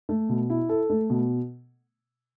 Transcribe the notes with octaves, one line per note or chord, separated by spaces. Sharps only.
A3
B2
E4
A4
A3
B2